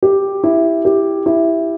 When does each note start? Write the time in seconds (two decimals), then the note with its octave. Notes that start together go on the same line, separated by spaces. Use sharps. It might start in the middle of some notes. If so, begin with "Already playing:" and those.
0.03 G4
0.44 E4
0.85 G4
1.26 E4